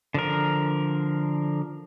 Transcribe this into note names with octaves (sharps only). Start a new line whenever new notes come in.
D3 F3 A#4